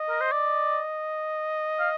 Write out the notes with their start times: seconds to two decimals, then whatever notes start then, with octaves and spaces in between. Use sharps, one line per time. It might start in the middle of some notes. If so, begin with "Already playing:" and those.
Already playing: D#5
0.09 A#4
0.21 C5
0.32 D5 D#5
1.79 F5